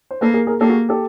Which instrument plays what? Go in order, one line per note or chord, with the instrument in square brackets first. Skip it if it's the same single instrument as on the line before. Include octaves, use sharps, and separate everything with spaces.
[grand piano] C5
[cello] A#3 [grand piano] A4 B4
[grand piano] G#4 A#4
G#4 A#4
[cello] A#3 [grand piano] G4 A4
[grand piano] F#4 G#4
G4 A4